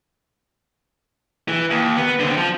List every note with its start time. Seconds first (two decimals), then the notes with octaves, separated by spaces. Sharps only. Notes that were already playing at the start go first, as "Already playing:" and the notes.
1.48 E3
1.70 D#2
1.97 B3
2.19 D3 C4
2.37 F3